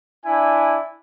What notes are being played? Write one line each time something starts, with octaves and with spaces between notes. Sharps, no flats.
D4 E4 G#5